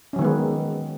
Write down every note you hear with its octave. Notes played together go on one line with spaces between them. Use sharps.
D#3 F#3 G#3 B3 C#4